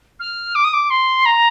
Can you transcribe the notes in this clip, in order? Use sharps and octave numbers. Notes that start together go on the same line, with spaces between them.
F6
D6
D#6
D6
C6
A#5